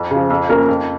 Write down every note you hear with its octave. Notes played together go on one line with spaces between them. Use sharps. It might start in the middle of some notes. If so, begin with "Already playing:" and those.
Already playing: F2
C#3 F3
F2
F3 A#3 C#4 A#4
F2